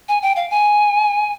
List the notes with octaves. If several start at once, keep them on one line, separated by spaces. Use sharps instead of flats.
G#5
G5
F5
G#5